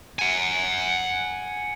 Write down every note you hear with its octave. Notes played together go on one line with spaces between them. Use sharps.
F#5 G#5